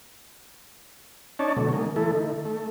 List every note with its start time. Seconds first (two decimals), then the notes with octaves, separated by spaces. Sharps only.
1.39 C#4 D#4 C#5 D5 A5
1.56 B2 D3 F#3 A3
1.73 D#3 G#3 A#3
1.96 E3 A3 E4 A4
2.12 D#3
2.45 A3